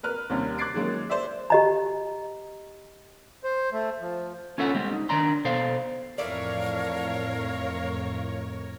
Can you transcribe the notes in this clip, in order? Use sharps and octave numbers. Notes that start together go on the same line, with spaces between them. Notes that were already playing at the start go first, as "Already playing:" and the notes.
A#4 B4 F6
D#2 C3 G3 C#4
D6 F#6 G#6 A6 C7 D7
D#3 F#3 G#3 A#3 C#4
C5 D5 E5
G4 D#5 A#5
C5
A3
F3
C#4 F4 A4 E5 F#5
G3 G#3 C4
D#4
D#3 D4 D5 A#5 C6
B2 A4 C5 D5 F5
F2 A2 E3 A3 A#4 C#5 D5 F5